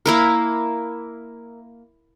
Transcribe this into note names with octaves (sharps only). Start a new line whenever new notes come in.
A#3 E4 A#4